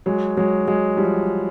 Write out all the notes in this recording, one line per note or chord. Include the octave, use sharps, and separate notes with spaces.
F#3 G#3
F#3 G#3
F#3 G#3
F3 G3